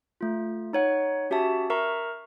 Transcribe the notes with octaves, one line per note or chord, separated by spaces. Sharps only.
A3 F4
D#4 C#5 F#5
C#4 F#4 G4 E5 A5
A#4 E5 A#5 C#6